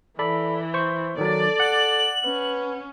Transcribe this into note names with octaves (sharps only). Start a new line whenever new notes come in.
E3 A4 D5 B5
C5 C#6
D#3 F#3 A4 D5
F#5 F#7
C#4 B4